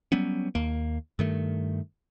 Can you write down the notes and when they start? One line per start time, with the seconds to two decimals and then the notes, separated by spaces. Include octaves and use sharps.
0.12 F#3 G3 B3 C#4
0.55 D#2 A#3
1.19 G2 D#3 A3